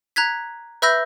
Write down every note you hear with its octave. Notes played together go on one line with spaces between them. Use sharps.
A#5 F#6 G#6 B6
B4 E5 B5 E6 G6 A#6